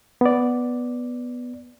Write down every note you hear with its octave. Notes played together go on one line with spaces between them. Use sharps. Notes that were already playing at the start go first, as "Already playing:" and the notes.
B3 D5